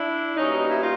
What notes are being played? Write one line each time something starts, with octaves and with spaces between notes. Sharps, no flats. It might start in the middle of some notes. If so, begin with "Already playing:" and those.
Already playing: D4 E4
B2 G3 A#3 C#4 D#4
E4
D#4 F4